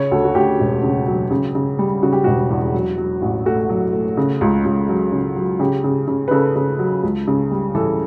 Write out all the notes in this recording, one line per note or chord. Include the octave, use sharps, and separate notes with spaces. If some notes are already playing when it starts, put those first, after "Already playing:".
Already playing: C#3 C#5
D2 A4
F#4
D2 G4
E1
C#3
F#3
C#3
C#3
G3
C#3 F#4
G4
E1 F#4
E2
F#3
F#3
A1
A3 F#4
F#3
A3
C#3
C#2
C#2
F#3
C#3
F#3
C#3 G4
C#3
C#3
B4
C#3 A4
C#3
F#3
C#2
C#3
G3
E3 A4